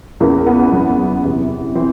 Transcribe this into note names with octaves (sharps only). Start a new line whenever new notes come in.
E2 C#3 E3 A#3
B3
F#2 C#3 E3
E2 C3 E3
E3 C4